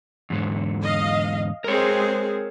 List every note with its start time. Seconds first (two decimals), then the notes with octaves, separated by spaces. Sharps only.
0.30 E2 G#2 D3
0.83 D#5 F5
1.64 G#3 C4 G#4 A#4 C#5